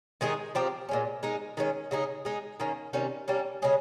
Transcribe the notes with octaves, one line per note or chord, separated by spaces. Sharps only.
D#3 G#3 D#4 G#4
F3 C4 G4 A#4
A#2 G#3 C#4
G#3 D#4 A#4
D#3 G#3 C#4
C#3 G#3 D#4 G#4
G#3 D#4 G#4
D#3 A#3 C#4
C3 D#3 G3 C#4
G3 A#3 C#4
C#3 G#3 C#4 G#4